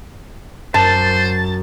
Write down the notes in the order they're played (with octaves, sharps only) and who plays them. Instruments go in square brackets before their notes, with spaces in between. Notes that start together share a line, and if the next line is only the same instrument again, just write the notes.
[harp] F#2 [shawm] C5 [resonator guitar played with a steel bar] A5 [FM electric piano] A6